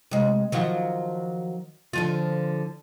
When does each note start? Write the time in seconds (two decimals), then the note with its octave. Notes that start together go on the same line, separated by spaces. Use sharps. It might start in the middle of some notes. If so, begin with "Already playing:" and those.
0.11 C3 G#3
0.52 D#3 F3 F#3
1.93 D3 F3 F4